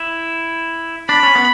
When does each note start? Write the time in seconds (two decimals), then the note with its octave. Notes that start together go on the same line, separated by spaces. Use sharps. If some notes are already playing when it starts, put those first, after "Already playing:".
Already playing: E4
1.08 D4 B5
1.23 C#4
1.35 B3